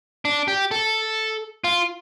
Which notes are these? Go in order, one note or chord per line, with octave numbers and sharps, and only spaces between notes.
D4
G4
A4
F4